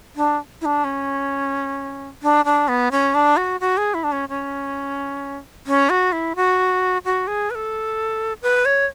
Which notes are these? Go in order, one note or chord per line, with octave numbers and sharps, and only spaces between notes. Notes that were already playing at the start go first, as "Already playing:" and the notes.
D4
E4
D4
C#4
D4
D4
B3
C#4
D4
F#4
F#4
G#4
E4
D4
C#4
C#4
C#4
F#4
E4
F#4
F#4
G#4
B4
A4
B4
C#5